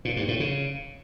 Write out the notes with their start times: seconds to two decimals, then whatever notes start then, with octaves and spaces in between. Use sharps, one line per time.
0.05 A#2
0.17 G2
0.28 A2
0.40 C#3